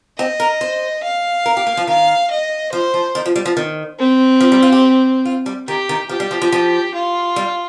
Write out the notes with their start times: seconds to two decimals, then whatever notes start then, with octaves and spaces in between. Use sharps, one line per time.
0.18 C4 D#5
0.40 A#4
0.61 C5
1.03 F5
1.46 A#4
1.57 G4
1.67 A#3
1.77 F3
1.87 D#3 F5
2.30 D#5
2.72 F3 C5
2.94 F3
3.15 D#3
3.26 F3
3.36 G3
3.46 F3
3.57 D#3
3.99 C4
4.41 F3
4.52 G3
4.63 F4
4.72 G4
5.25 F4
5.46 G3
5.68 D#3 G4
5.89 D#3
6.09 F3 G4
6.20 G3
6.31 F3
6.42 F3
6.52 F3
6.95 F4
7.36 G3